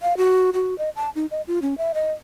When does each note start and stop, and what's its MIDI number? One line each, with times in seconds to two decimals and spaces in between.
0.02 0.17 77
0.17 0.50 66
0.53 0.77 66
0.78 0.89 75
0.96 1.09 81
1.15 1.26 63
1.31 1.41 75
1.47 1.59 65
1.62 1.74 61
1.78 1.92 76
1.94 2.12 75